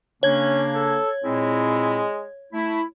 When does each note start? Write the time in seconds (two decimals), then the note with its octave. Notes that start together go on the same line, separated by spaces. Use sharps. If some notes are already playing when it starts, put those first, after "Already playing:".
0.23 C#3 A#3 C#4 D4 C#5 G#6
0.74 A4
1.24 A#2 G#3 C4 E4
2.53 A3 E4